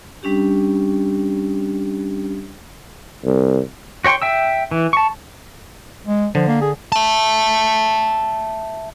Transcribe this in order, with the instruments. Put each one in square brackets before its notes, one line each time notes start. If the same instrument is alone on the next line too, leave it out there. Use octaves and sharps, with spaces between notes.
[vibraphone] G3 C#4 D4 G4
[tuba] C2
[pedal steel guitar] F#4 C#5 G5 C6 C#6
E5 G5 E6
E3
A5 C#6
[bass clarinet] G#3
[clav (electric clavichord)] D3 [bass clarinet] F3
[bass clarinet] A#3
G#4
[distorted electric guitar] E5 A5